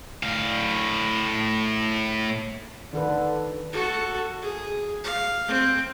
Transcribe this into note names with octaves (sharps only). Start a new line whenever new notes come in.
A2 F5
D3 D#3 A4 B4
F#4 A4
G#4
F5
C4